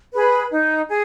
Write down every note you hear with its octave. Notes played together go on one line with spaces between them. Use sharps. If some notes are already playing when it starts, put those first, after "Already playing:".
G#4 B4
D#4
G#4